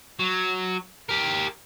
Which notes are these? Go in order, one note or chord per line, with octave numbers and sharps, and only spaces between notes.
F#3
G4 A#4